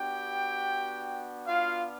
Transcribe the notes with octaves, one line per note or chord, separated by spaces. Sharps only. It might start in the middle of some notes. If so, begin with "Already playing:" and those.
Already playing: B3 D4 F#4 G4 G5
F4 F5